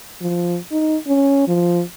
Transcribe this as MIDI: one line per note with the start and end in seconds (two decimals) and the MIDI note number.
0.21 0.58 53
0.72 0.97 63
1.07 1.47 61
1.48 1.82 53